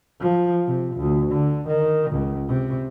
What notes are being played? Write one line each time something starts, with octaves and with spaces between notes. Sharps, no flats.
F3
C3
D2
D3
D#3
C#2
C3